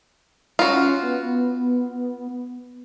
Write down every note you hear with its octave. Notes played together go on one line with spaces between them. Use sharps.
C#4 F4 F#4
B3